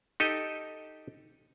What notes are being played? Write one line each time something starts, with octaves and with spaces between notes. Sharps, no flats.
D#4 G4 A4 D#5